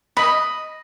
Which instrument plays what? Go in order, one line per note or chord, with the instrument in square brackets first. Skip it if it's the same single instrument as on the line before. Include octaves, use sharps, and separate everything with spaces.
[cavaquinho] D#5 [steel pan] B5